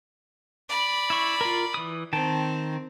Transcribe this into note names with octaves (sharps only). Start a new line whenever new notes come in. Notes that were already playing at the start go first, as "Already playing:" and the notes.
D5 B5
E4 C#6
F4 A#4
E3 D#6
D#3 C4 G5 A5